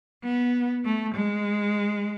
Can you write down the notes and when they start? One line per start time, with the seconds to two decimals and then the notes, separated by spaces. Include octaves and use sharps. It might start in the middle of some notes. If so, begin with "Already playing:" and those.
0.23 B3
0.85 A3
1.15 G#3